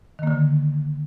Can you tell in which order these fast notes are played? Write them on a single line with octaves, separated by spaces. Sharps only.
D#3 A#3 D3